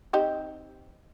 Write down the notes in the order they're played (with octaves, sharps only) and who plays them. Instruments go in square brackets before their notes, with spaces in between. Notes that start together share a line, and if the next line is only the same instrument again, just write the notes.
[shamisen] C4 D#4 G4